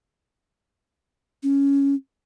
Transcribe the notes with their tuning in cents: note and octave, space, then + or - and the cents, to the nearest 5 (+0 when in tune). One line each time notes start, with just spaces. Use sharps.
C#4 +5